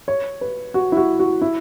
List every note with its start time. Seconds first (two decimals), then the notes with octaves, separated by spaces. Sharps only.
0.08 C#5
0.41 B4
0.74 F#4
0.92 E4
0.97 F#4
1.19 F#4
1.41 E4